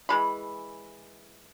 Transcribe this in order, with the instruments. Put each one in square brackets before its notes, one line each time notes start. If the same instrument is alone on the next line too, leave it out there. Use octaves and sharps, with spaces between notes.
[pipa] E3 G#3 B5